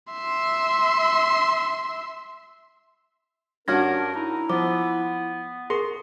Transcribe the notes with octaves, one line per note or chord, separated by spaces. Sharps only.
E5 C6
G2 C#4 D4 F#4 A#4 F6 G#6 A#6
D#4 E4
F3 B3 D6
G#4 A#4 C6